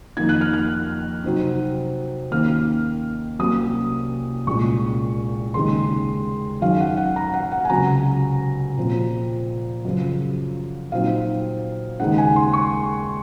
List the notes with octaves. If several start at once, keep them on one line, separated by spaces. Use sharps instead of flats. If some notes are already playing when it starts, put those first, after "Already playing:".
F2 D#3 A#3 D#4 G#6
F#6
F6
F#6
C3 F#3 C4 D#4
D#2 D#3 A#3 C#4 F6
C2 C3 F#3 A#3 C#4 D#6
C2 A#2 G#3 C#4 C#6
D#2 C#3 G#3 D#4 C6
F#2 D#3 F#3 C#4 F5
F#5
F#5
A#5
F#5
F#5
G#5
C#2 C3 F#3 C#4 A#5
A#2 F3 C4
F#2 C#3 F3
A#2 F#3 C4 D#4 F5
D#2 C#3 G#3 D#4 F#5
G#5
C6
C#6